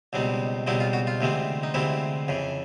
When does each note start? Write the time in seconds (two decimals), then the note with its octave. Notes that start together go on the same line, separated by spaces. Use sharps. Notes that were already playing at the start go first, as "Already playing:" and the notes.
0.13 C#2 B2 G3 C4 D#4
0.67 C#2 B2 G3 C4 D#4 E4
0.80 F4
0.93 F#4
1.07 F4
1.21 D2 C3 E3 G#3 C4
1.63 D#4
1.74 D2 C3 E3 G#3 C4 E4
2.28 F2 C#3 E3